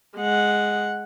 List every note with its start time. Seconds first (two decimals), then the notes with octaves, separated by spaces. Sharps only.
0.17 G#3 F#5